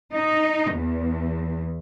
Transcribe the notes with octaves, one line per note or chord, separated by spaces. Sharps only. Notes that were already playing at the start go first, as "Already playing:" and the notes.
D#4
E2